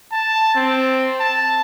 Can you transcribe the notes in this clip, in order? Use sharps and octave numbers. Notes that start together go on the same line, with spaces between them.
A5
C4
A5